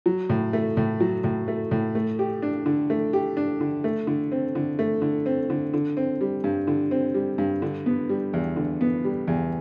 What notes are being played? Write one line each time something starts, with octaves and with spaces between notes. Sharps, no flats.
F#3
A2
A3
A2
F#3
A2
A3
A2
A3
G4
D4
D3
A3
G4
D4
D3
A3
D3
C4
D3
A3
D3
C4
D3
D3
C4
G3
G2
D3
C4
G3
G2
D3
B3
G3
E2
D3
B3
G3
E2